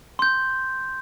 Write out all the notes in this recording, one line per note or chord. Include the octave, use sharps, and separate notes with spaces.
C6 G6